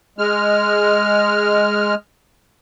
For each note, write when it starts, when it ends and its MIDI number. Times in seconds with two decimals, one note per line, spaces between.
0.18 1.95 56
0.18 1.95 89